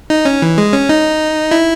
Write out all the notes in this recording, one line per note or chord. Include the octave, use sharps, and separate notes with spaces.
D#4
C#4
E3
G#3
C#4
D#4
E4